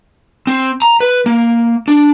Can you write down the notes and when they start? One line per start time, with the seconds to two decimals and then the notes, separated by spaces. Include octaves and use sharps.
0.47 C4
0.82 A#5
1.00 B4
1.26 A#3
1.88 D4